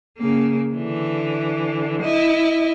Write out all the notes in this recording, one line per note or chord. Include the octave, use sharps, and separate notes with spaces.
C#3 A#3
D3 E3
E4 D#5